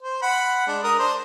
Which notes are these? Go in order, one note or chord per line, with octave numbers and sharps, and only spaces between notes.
C5
F#5 B5
G#3 D4
A#4 A#5 D#6
D4 C5